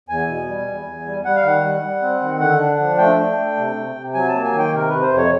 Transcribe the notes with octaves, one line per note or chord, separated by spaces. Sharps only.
E2 G#5
B2
G3
E2
E2
G3
G3 F#5
F5
D#3 F#5
G3
G3
C4
D#3
D3 F#5
D4
F3
A3 G5
D4
A3
C3
C3
C3
F#3 G#5
A#3 A5
G#5
D#3
G5
C3 A#4
C3 B4
C5
F2
C#5